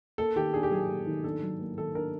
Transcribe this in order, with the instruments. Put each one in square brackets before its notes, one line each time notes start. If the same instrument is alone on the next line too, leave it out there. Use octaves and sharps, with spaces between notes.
[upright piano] A#3 [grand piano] A4
[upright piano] D#3 [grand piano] G4
[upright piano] D4 [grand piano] G#4
[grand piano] G4
[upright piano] F#3 [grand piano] G#4
[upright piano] A#3
D#3
[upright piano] D4 [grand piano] A4
[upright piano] F#3
A#3
[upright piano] D#3 [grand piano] A4
[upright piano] D4 [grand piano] A#4